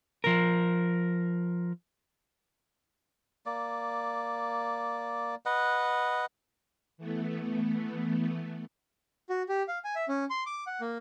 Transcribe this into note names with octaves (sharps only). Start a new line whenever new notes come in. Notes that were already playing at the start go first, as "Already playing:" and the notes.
F3 A#4
A#3 D5
B4 D#5 F#5
E3 A3 B3
F#4
G4
F5
G#5
E5
C#4
C6
D6
F#5
A#3